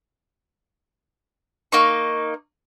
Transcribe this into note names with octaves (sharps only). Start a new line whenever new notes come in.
A#3 D#4 C#6